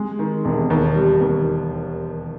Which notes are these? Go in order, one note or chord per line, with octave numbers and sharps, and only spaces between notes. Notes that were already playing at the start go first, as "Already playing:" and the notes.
Already playing: G#3
D#3
E1
D#2
G3
D#2